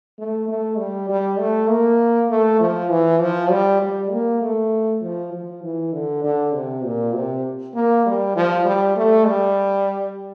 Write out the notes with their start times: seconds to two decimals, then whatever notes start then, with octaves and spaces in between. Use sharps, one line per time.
0.18 A3
0.48 A3
0.78 G3
1.09 G3
1.39 A3
1.69 A#3
2.30 A3
2.60 F3
2.90 E3
3.21 F3
3.51 G3
3.81 G3
4.12 A#3
4.41 A3
5.02 F3
5.32 F3
5.63 E3
5.93 D3
6.24 D3
6.54 C3
6.84 A#2
7.15 C3
7.75 A#3
8.06 G3
8.36 F3
8.65 G3
8.96 A3
9.27 G3